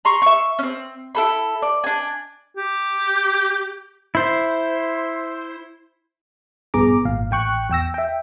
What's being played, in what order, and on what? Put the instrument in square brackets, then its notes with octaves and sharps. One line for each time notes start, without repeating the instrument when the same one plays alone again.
[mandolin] A#5 C6 C#6
E5 C#6
C4 C#4
E4 A4 B5
D5
D4 G#5
[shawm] G4
[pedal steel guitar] E4 C5
[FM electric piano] A#1 G2 B3 G#4 A#5 D6
G#1 A#2 F5
A1 G5 C#6 F#6
E2 G5 E6 A#6
E5 G5